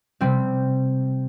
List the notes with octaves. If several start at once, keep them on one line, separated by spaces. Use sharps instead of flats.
C3 G3 C4 G4